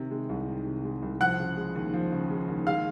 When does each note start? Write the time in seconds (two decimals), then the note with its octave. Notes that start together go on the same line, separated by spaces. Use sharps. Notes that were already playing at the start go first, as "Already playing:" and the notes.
Already playing: C3 D#3
0.11 G#3
0.29 C2
0.48 D#3
0.66 C3
0.85 G#3
1.03 C2
1.21 F3 F#5 F#6
1.39 C#3
1.57 G#3
1.76 D#2
1.93 F3
2.12 C#3
2.30 G#3
2.48 D#2
2.67 G#3 F5 F6